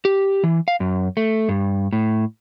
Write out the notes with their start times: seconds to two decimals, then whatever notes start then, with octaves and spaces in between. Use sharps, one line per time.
0.05 G4
0.44 E3
0.68 F5
0.80 F#2
1.17 A3
1.49 G2
1.93 A2